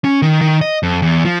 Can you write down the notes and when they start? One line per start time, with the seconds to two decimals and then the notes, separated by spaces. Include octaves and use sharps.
0.04 C#4
0.22 D#3
0.41 D#3
0.61 D#5
0.83 F2
1.02 E2
1.25 F3